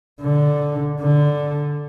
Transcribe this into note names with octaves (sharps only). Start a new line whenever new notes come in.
D3
D3